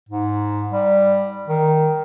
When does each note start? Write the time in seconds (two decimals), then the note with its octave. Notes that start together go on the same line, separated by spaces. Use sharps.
0.09 G#2
0.72 G3
1.48 D#3